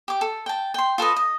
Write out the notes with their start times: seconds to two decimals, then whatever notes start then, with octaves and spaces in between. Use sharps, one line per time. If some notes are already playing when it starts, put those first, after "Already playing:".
0.08 G4 D6
0.21 A4
0.46 G5 A5
0.74 G5 C6
0.98 F4 A4 B4 D#5
1.16 D#5